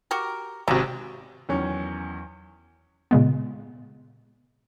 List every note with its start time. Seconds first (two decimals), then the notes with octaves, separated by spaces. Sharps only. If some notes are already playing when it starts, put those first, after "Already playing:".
0.11 F#4 G4 A#4
0.68 G#1 C3 C#4 F#4 A#5
1.49 E2 D#3 F#3 C#4
3.11 A#2 C#3 G#3 B3